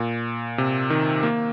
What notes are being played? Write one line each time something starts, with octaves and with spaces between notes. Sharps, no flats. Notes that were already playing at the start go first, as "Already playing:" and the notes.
Already playing: A#2
C3
D#3
A#3